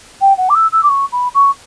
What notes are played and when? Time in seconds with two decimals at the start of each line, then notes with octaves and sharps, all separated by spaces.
0.21 G5
0.37 F#5
0.49 D6
0.54 E6
0.72 E6
0.83 D6
0.89 C#6
1.12 B5
1.34 C#6